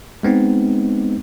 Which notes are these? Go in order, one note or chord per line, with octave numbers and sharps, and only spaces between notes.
G#3 B3 C4 D#4